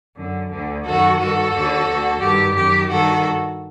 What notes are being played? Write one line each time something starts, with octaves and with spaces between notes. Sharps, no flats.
F#2 D3
D2 D3
F#2 D#3 F#4 A4
G2 D#3 F#4 A4
D#2 D3
D2 D3
G2 D#3 G4
F#2 D#3 G4
G2 D#3 F#4 A4